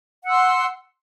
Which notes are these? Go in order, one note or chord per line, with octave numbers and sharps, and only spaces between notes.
F#5 C6 E6